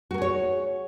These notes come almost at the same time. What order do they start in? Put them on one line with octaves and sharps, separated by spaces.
F#4 A#4 G#4 C#5